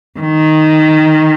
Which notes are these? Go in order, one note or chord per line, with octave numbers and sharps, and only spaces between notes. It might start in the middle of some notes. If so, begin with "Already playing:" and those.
D#3